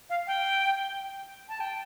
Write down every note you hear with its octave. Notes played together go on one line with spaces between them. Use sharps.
F5
G5
A5
G5